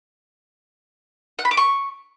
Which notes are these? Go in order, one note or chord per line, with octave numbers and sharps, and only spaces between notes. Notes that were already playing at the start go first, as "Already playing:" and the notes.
F#5
B5
D6
C#6